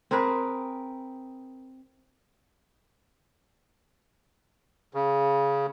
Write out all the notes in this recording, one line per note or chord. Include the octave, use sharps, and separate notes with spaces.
C4 G#4 A#4 B4
C#3